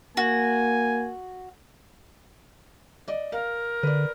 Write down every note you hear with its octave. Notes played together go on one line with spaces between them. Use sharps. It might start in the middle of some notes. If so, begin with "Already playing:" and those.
A#3 F#4 G#5
D5 D#5
A#4 F5
D3 B4 D5